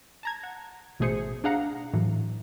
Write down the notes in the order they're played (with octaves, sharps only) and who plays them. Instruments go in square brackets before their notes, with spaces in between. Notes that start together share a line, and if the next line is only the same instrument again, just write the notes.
[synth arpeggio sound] A5 A#5 G#6
F#5
A1 B2 A3 G#4 C5 C#7
D4 G#4 F5 F#5 A#5
A2 E3 F#3